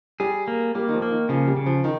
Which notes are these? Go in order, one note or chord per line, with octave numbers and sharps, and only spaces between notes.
G3 G#4
A#3
G3 A#3
D#3
F3
A#3
D#3
C#3 F3
G3
C#3
F3
D#3